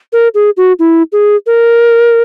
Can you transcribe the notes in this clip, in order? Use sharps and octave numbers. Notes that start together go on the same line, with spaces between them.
A#4
G#4
F#4
E4
G#4
A#4